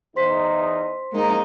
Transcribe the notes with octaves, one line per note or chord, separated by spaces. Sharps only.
E2 D#4 C5 C6 B6
G#3 A#3 D#4